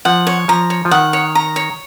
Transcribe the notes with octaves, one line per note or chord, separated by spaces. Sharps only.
F3 F#5
C#5
F3 A#5
C#5
F3
D#3 F#5
C#5
A#5
C#5